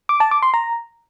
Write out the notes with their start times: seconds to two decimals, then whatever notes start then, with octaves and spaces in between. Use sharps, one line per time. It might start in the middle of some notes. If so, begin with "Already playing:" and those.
0.09 D6
0.20 A5
0.31 D6
0.43 C6
0.54 A#5